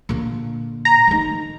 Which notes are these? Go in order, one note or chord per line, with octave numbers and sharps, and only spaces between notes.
A#2 D3
A#5
D#3 D#4